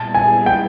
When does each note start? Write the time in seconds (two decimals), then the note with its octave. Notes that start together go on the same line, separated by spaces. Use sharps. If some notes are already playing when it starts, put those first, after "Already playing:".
Already playing: A#2 G3 B3 E4 G#4 A5
0.15 G#5
0.46 G5